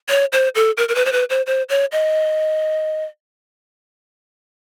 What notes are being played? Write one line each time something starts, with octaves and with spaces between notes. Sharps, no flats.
C#5
C5
A4
A#4
A#4
B4
C5
B4
C5
C5
C#5
D#5